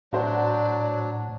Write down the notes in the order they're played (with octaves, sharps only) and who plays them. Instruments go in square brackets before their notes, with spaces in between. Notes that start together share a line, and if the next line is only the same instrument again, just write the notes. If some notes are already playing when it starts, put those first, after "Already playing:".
[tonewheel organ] A2 [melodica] F#3 D4 [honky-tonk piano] F#4 C5 [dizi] D5